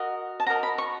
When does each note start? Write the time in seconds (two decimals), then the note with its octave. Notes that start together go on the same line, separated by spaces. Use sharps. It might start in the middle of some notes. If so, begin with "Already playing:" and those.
Already playing: F#4 A#4 D#5
0.40 A5
0.46 F#4 A#4 D#5 A#5
0.63 B5
0.78 C#6